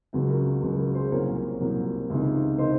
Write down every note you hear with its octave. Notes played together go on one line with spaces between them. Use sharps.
C#2 C#3 F#3 F#4
F#4 A#4
C#2 C#3 F#3
F#4 A#4
G#4 C5
C2 A#2 F#3 A#4 C#5
C2 A#2 F#3
C#2 C3 D#3
C3 D#3 C5 D#5